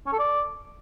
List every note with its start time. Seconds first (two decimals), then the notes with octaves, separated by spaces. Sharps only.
0.06 C#4
0.13 A4
0.19 D5